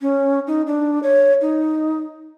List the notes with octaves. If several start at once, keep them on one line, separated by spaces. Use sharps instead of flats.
C#4
D#4
D4
C#5
D#4